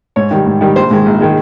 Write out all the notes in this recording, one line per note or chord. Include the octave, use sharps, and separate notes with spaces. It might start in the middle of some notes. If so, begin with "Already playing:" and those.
G#2 C#5
D#3 G3
G#2
D#3 G3
A#1 C5
G#2 D#3 G#3
A#1
D#3 G#3